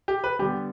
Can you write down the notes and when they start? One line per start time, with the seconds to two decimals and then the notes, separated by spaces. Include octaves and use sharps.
0.08 G4
0.24 B4
0.39 D3 G3 B3 G4